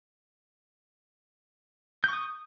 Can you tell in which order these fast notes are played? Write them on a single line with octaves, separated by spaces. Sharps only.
G6 C#6 D#6